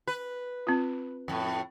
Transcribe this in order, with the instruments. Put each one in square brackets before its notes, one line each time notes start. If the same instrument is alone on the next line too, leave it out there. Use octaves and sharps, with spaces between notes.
[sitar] B4
[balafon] C4 F4
[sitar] F2 A2